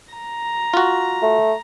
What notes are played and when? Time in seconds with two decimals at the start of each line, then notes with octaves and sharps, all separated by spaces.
0.12 A#5
0.74 F4 F#4
1.23 A3